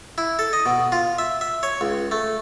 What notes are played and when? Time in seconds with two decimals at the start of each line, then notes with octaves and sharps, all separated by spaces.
0.18 E4
0.39 A4
0.53 D#5
0.66 B2
0.92 F4
1.19 E5
1.41 E5
1.63 C#5
1.81 C#2
2.11 A3